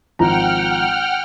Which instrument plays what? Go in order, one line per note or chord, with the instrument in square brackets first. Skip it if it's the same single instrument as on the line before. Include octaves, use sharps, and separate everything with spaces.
[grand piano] G#1 F3 A#5 [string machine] F#5 G5 F6